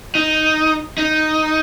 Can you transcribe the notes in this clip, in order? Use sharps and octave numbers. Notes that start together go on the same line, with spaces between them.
D#4
D#4